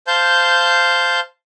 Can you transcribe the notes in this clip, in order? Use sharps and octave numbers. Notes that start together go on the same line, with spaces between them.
C5 F5 A5 G6